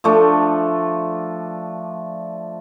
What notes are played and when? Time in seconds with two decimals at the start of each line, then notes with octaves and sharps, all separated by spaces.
0.04 F3 A3 D4